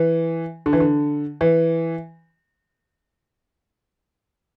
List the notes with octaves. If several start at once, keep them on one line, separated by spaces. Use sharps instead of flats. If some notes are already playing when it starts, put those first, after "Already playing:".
Already playing: E3
D3
E3
D3
E3